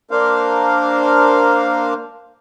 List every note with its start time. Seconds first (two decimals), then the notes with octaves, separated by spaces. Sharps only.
0.11 A#3 D4 A#4 C5 F5